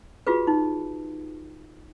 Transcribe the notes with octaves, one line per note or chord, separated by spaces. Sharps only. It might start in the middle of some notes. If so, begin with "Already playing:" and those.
F4 F#4 G#4 B4
D#4